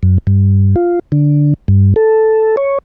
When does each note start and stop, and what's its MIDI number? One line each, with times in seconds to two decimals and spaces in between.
0.03 0.18 42
0.27 0.75 43
0.76 0.99 65
1.12 1.54 50
1.68 1.94 43
1.96 2.56 69
2.57 2.78 73